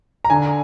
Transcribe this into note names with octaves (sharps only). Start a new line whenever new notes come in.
A#5
D3 G#5